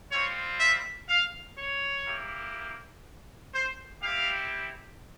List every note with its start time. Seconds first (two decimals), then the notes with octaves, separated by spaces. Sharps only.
0.11 G3 C4 F4 C#5
0.60 E5
1.09 F5
1.58 C#5
2.06 A#3 E4 G4
3.54 C5
4.02 G3 C4 E4 G4 F5